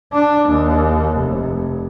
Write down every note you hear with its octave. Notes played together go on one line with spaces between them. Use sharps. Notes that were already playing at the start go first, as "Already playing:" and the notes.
D4
D#2
F1